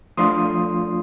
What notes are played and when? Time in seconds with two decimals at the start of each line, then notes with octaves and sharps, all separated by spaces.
0.17 F3 A3 D4 F4 C6 D#6